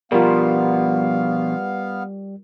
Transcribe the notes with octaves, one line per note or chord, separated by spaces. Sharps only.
B2 F3 G3 B3 F4 A#4 F5